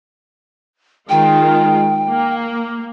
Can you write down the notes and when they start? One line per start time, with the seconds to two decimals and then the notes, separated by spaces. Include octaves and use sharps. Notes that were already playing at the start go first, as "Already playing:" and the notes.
1.09 D#3 G#3 F4 G5
2.10 A#3